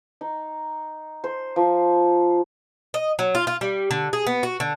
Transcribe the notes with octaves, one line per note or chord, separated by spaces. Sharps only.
D#4
C5
F3
D#5
F#3
F4
F4
G3
D3
G#4
B3
F#4
D3